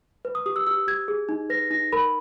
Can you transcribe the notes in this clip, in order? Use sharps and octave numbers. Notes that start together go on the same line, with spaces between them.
B4
D#6
G4 D#6
E6
G4 E6
G4 G#6
G#4
D#4
B4 A#6
D#4 A#6
A#4 B5